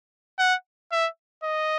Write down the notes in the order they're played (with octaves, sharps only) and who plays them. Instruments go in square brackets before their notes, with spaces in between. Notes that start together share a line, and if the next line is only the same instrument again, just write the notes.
[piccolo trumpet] F#5
E5
D#5